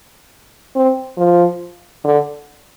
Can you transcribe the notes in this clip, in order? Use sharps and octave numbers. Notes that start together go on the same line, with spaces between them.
C4
F3
D3